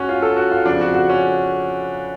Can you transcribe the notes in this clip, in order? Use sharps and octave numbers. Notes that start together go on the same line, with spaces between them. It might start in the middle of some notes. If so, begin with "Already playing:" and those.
Already playing: G#2 F#3 C#4 F#4
F4
A4
F#4
F4
F2 C#3 F3 D4
F#4
F#4
C#4